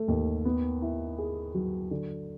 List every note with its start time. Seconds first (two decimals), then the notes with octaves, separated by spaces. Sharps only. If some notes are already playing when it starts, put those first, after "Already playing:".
Already playing: A3
0.08 D#2
0.45 B3
0.82 E4
1.19 G#4
1.54 F#3
1.91 D3